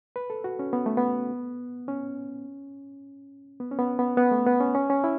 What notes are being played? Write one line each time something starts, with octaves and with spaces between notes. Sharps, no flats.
B4
A4
F#4
C#4
B3
A3
B3
C#4
B3
C#4
B3
B3
B3
A3
B3
C#4
C#4
C#4
E4